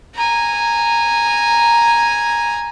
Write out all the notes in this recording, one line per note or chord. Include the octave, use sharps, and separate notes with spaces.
G#5 A#5